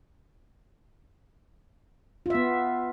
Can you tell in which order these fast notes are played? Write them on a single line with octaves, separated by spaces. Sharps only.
F4 E5 B3